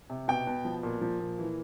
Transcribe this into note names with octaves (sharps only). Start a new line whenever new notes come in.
C3
B2 G5
B2
F3
A#2
F3
A#2
E3